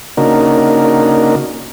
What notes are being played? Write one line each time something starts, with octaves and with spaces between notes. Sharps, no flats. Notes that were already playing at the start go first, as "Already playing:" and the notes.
C#3 A#3 D4 D#4 F#4 A#4